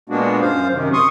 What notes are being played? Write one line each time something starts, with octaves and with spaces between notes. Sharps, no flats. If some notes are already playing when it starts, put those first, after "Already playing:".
A#2 G#3 A#3 B3 D4 F#4
F#2 C5 F5
F#2 C3 D#3
C6 C#6 D#6